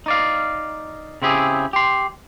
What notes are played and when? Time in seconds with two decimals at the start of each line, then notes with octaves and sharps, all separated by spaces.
0.06 D#4 D5 F5
1.22 C#3 C4 E4 G4 G#4
1.73 G4 C6